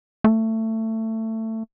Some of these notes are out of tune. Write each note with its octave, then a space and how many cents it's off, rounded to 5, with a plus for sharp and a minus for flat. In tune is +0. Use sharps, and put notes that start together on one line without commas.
A3 +20